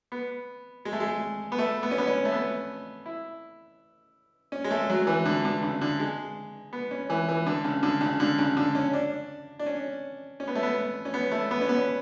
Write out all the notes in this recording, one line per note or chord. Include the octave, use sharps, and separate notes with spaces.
B3
G#3
A3
G#3
B3
A3
B3
C#4
B3
C#4
A3
B3
E4
C#4
G#3
A3
F#3
E3
D3
D3
C#3
D3
G#3
B3
C#4
E3
E3
D3
C#3
D3
C#3
D3
C#3
D3
C#4
D4
D4
C#4
C#4
B3
A3
B3
C#4
B3
A3
B3
C#4
B3